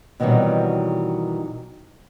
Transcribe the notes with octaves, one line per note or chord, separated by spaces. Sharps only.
B2 D#3 E3 F#3 G3 C4